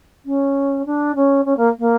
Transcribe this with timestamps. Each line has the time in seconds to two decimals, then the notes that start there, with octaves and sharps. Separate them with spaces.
0.25 C#4
0.85 D4
1.15 C#4
1.45 C#4
1.57 A#3
1.79 A#3